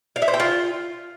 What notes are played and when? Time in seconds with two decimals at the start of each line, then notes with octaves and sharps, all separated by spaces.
0.16 F5
0.22 E5
0.28 C5
0.34 G5
0.40 F4